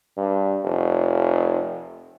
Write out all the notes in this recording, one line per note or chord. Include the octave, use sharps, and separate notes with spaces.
G2
F1